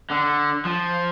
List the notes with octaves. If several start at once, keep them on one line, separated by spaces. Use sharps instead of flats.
D3
F3